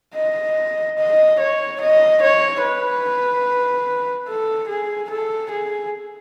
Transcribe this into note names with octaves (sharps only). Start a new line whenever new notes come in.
D#5
D#5
C#5
D#5
C#5
B4
A4
G#4
A4
G#4